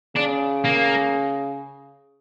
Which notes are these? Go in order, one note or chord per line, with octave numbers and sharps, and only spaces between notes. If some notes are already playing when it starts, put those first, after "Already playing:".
C#3 D4
A#3